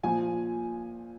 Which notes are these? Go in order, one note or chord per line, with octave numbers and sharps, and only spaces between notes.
A#2 F3 G#5